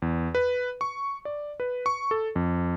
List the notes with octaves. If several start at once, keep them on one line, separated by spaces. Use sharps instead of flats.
E2
B4
C#6
D5
B4
C#6
A4
F2